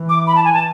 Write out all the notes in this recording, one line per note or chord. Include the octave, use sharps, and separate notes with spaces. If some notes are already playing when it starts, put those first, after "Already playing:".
Already playing: E3
D6
B5
A5
G#5
A5